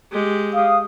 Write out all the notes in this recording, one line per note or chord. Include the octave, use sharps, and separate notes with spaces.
G#3 G4
F5 D#6